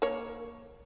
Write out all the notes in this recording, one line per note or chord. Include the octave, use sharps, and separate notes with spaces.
A#3 C#5